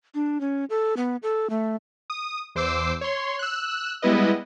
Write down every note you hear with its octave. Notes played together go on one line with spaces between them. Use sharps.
D4
C#4
A4
B3
A4
A3
D#6
E2 C5 D6 E6 C7
C#5 C6
E6 F#6
G3 G#3 B3 E4 B4 D#5